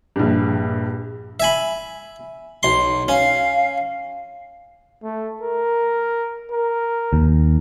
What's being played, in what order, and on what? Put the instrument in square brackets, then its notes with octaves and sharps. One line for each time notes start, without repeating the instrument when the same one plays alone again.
[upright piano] A#1 G2
[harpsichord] E5 G#5 B5
B1 C6
[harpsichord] C#4 [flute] F5
[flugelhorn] A3
A#4
A#4
[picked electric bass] D#2